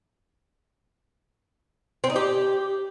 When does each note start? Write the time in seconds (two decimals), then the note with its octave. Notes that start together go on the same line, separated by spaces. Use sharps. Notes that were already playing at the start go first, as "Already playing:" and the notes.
2.04 C4
2.10 D#4
2.16 G4